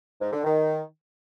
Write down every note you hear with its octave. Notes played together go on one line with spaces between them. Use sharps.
G#2
D3
D#3